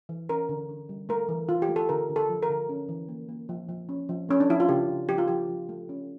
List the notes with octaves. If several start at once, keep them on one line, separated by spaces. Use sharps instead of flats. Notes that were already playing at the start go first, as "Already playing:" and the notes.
E3
C#4 A#4
D3
D3
G3
A3 A#4
E3
E3 F4
G4
A3
A4
D3 A#4
D3
A4
F3
A#4
D3
C#4
E3
A#3
A#3
F3
F3
C#4
F3
A3 C#4
D4
F3 E4
F4
C#3 G4
C#3
F3 G4
F4
F3 G4
F3
A3
C#4